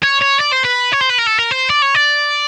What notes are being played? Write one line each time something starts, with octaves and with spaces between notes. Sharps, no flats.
C#5
C#5
D5
C5
B4
C#5
C5
B4
A#4
A4
A#4
C5
D5
C#5
D5